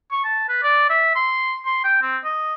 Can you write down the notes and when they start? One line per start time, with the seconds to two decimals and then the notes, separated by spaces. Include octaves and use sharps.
0.12 C#6
0.24 A5
0.49 B4
0.63 D5
0.90 E5
1.16 C6
1.66 C6
1.84 G5
2.02 C4
2.25 D#5